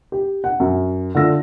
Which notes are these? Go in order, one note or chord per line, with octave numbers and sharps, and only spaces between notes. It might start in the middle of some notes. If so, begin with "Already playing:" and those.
G4
F#5
F#2
D3 A3 F4 D5 E6 A#6